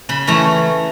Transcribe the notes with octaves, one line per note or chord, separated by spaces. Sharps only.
C#3 B5
E3 A3 C#4 A#5